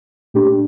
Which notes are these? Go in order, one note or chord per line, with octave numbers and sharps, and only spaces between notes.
A#2 A3 D4 G4